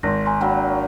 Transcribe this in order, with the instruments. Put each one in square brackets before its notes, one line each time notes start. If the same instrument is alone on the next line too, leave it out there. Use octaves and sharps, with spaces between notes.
[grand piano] G#1 [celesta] C6 A#6
[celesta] G#5 A#5 C6
[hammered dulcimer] F#3 A#3 D4 [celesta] G5 B5